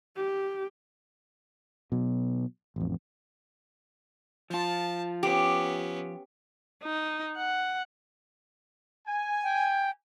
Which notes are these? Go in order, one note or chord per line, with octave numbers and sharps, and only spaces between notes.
G4
B2 F#3
A1 F2
F3 F4 A5
B3 C#4 G4
D#4
F#5
G#5
G5